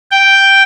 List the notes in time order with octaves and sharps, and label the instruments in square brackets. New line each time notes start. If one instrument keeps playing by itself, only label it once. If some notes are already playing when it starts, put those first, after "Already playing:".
[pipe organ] G5